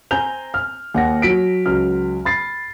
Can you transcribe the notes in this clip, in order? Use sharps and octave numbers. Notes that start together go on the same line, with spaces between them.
C4 C5 G#5 A#5 G6 F7
F6
D#2 F#5 A#6
F#3 B6 D7
C#2 F#3 F6
B5 A6 C7